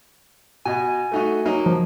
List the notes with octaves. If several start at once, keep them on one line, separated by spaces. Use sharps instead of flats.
B2 D#5 G#5
A3 D#4 F#4
F#3 A#3 D#4
F3